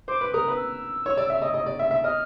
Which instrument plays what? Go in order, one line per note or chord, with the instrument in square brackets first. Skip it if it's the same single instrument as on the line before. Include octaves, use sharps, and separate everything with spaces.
[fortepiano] C5 [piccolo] D6
[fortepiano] B4
[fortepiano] A#4 [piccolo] D#6
[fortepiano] B4
[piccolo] E6
[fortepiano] C#5
D5
E5
D#5
D#5
D5
E5
E5
[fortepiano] D#5 [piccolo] F6